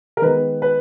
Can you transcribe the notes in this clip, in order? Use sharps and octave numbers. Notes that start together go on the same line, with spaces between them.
A#4
D#3 G#3 B3 B4
B4